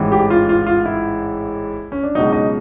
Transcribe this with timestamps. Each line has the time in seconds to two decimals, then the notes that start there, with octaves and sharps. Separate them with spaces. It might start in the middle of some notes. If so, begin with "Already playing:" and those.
Already playing: A1 G#2 E3
0.12 G4
0.30 F4
0.49 F4
0.67 F4
0.86 E4
1.92 C#4
2.03 D4
2.15 C#2 B2 F#3 D#4
2.33 D#4